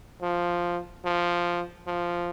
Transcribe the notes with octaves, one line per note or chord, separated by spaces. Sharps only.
F3
F3
F3